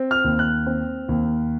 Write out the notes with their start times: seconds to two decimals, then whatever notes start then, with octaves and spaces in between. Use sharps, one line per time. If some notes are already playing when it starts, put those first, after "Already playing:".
Already playing: C4
0.11 F6
0.24 D#2
0.39 F#6
0.67 C4
1.09 D#2